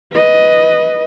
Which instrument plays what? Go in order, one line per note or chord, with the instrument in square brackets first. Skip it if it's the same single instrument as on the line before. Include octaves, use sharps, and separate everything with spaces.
[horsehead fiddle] B4 D#5